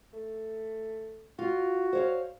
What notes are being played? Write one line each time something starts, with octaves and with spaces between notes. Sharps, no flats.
A3
F4 F#4
C5 C#5 F5